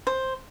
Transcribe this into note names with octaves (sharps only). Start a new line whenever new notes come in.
C5